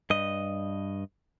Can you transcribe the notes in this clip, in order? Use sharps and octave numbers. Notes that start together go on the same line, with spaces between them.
G2 D#5